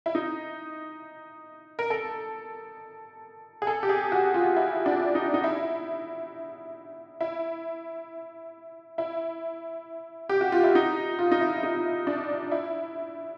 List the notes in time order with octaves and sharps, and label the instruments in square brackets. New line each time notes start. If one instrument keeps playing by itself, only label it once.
[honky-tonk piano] E4
D#4
A#4
A4
G#4
A4
G4
G#4
F#4
F4
E4
D4
D#4
D#4
E4
E4
E4
G4
F#4
F4
E4
D#4
F4
D#4
E4
D#4
D4
E4